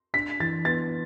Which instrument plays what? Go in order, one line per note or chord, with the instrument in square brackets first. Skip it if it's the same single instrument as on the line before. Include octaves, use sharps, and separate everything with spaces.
[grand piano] D4 B6
E3 A6
B3 A6